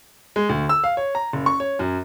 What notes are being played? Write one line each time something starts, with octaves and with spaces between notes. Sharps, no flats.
G#3
D2
E6
F5
C#5
A#5
F#1
C#6
C#5
F#2